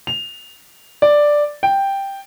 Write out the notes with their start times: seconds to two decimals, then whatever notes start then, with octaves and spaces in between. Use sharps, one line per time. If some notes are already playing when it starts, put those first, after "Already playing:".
0.07 F7
1.02 D5
1.63 G5